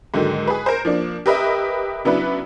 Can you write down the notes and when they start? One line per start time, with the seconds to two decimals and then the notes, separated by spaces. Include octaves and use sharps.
0.14 G#2 D3 D#3 F#3
0.47 G#4 B4
0.66 A#4 C5
0.85 F3 A#3 D4
1.26 G4 A#4 B4 D#5 E5
2.05 C#3 F#3 B3 D4 E4 B4